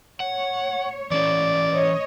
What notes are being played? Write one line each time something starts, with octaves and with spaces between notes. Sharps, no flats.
C#5 F#5
E3 C#4 D5
C#5 D#5